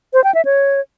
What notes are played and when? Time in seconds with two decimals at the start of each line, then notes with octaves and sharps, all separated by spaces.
0.13 C5
0.24 G5
0.35 E5
0.45 C#5